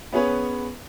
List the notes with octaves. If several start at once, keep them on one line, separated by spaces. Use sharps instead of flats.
B3 C#4 G#4 B4 C#5